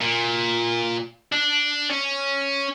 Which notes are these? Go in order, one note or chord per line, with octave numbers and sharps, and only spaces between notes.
A#2
D4
C#4